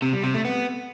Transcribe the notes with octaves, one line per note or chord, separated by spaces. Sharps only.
C3
G3
C3
A3
B3